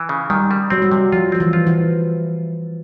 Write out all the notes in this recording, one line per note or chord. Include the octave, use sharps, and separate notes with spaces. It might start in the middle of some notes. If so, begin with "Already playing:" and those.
Already playing: E3
C#3
D#3 G3
G3
F#3 C4
G3
C3 F#3
F3 F4
F3 C4
E3
F4
E3